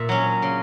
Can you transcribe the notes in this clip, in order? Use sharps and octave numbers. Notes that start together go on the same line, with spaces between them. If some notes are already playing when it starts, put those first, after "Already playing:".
Already playing: A#2 E5
F#3 C#4
C#3